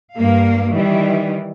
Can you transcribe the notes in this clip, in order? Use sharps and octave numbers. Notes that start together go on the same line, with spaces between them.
G2 A#3 F5
D#3 E3 G3